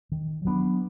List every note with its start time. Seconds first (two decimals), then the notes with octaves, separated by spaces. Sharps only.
0.12 D#3
0.45 F#3 B3 D4